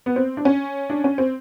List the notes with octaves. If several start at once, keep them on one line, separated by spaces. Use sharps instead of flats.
B3
C4
D4
C#4
D4
C#4
C4